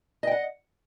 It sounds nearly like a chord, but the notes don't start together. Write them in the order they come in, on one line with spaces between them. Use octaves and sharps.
D#5 G5 F#5